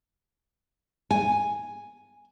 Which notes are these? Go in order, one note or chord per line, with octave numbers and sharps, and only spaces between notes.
G#5